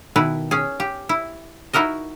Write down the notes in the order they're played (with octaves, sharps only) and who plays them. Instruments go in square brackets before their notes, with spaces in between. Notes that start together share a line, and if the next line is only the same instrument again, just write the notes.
[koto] B2 D#3 E4 B4
C#4 G#4
G4
E4
D#4 E4 F#4 A#4 D#5